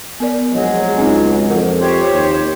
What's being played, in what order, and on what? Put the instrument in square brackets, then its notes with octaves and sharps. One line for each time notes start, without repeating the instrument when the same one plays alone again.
[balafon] B3 A#4 D5
[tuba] A#1 [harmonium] F#3 G#3
[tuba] C#2 [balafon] C4 D4 D#4
[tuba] F2 [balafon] A#4 F#5
[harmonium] G4 C5 C#5
[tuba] D#2